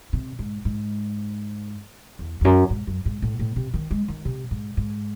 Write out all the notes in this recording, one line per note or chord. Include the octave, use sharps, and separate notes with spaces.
C3
G#2
G#2
E2
E2
F#2
G#2
F#2
G#2
A2
A2
C3
D#3
G#3
D#3
C3
G#2
G#2